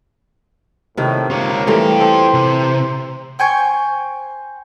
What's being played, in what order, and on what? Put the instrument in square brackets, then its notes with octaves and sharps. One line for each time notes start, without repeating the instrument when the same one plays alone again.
[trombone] A2 [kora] C3 D#3
[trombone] A#3 [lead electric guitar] F4 C#5
[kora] E3 G3 A3 [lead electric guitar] F4 G5
[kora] A4 [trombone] C5
[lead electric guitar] C3
[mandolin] C5 G5 G#5 C#6